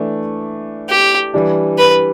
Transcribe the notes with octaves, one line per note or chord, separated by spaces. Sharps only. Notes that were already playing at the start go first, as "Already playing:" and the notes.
Already playing: E3 A3 D4
G4
E3 G3 D4
B4